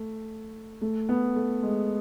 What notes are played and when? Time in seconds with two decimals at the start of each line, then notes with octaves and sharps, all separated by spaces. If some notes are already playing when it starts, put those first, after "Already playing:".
Already playing: A3
0.82 A3
1.09 B3
1.36 A3
1.63 G#3